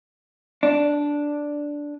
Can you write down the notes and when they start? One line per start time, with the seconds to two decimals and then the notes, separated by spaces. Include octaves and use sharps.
0.63 D4